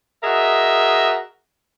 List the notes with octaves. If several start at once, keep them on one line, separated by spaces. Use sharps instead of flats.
F#4 G#4 A#4 D#5 E5